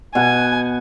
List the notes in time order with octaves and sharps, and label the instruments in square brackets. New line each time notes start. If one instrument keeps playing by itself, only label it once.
[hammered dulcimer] B2 F#5 [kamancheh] G#5